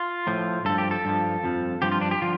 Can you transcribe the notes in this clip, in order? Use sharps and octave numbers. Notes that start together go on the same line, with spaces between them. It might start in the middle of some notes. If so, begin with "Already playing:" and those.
Already playing: F4
A2 F3
G2 F3 A4
G4
A4
G2 F3
F2 F3
G2 F3 G4
F4
D4
G4
D3 F3 F4